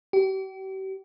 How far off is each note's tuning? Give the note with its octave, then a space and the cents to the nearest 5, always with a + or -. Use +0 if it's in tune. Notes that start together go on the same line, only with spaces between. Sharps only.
G4 -40